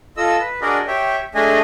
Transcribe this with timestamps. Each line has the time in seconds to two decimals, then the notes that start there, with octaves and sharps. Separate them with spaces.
0.17 F4 A4 D#5 E6
0.40 B4
0.61 D4 F#4 G#4 A#4 D5 D#5
0.87 G4 C#5 E5 G5
1.35 A3 D4 G#4 D#5 G#5